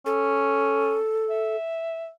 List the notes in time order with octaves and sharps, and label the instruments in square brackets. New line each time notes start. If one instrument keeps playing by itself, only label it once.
[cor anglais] C#4 [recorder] A4
[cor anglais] E5